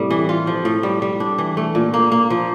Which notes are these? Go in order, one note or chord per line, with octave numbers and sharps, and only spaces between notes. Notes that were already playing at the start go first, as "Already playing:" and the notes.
Already playing: A2 C3 G3
E3
F4
F3
A2
G3
G3
D4
E3
A3
A#2
A#3
A#3
F3